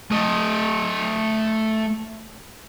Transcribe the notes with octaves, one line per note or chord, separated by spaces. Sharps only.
A3 D#5